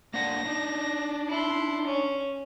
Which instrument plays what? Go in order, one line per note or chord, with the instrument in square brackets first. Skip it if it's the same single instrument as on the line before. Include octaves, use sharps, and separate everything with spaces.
[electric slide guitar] A#3 D4 F#5 [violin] A#6
[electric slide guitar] D4 D#4
[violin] E4 C6
C#4